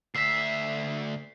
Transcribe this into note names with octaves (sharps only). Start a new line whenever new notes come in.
D2 E5 B6 C7